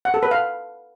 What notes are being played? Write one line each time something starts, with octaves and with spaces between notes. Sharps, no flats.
F#5
A4
B4
F5